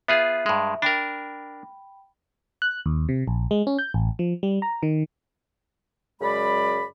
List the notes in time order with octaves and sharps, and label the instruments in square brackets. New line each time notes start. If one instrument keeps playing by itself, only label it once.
[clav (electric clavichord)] B3 F4 G#4 [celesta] E5
[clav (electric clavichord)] G2 G#3
[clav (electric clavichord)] D4 A#4 [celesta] G5 B5
[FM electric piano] F#6
D#2
C3
A#1
G#3
C#4
G6
A1
F3
G3
A#5
D#3
[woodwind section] F#2 C#3 G#3 D5 B5